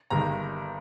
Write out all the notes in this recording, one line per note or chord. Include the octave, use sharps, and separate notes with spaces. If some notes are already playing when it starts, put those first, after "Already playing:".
G1 G2 D#3 A#5